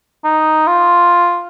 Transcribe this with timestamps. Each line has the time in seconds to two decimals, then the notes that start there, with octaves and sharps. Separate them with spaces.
0.24 D#4
0.67 F4